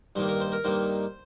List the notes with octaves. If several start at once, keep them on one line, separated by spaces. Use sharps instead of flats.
G2 D#3 A#3 C5
A#4
C5
A#4
G2 D#3 A#3 C5